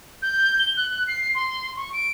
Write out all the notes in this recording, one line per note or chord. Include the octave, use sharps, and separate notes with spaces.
G6
G7
F#6
C7
C6
C#6
D7